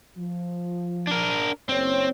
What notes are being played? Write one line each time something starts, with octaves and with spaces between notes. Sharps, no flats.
F3
D4 A#4
F#1 C4 C#5